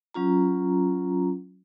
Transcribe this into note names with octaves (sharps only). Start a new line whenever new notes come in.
F#3 C#4 F4 A#5